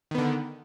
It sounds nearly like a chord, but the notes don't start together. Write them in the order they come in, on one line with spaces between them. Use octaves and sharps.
D#3 B3 D3